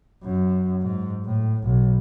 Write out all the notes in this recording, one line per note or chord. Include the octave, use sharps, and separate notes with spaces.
F#2
G#2
A2
B1